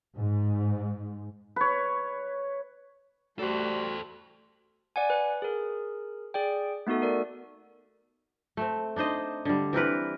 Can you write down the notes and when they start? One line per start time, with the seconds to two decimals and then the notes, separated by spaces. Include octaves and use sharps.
0.17 G#2
1.56 B4 C#5
3.39 G3 A3 F#4 A4 C5
4.96 D5 F#5 G#5
5.10 B4
5.42 G#4 A#4
6.34 G#4 D5 G5
6.87 A3 B3 D#4 F#4 A4
7.02 A#4 D5
8.57 A3 C4
8.96 D4 D#4 C5 D#5
9.45 D3 G3
9.73 E3 C4 A#4 B4